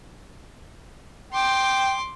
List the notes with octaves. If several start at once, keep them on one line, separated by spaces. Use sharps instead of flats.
G5 C6 D6